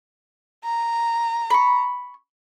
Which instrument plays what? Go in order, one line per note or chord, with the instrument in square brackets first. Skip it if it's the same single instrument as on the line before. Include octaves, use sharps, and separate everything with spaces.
[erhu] A#5
[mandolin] B5 C#6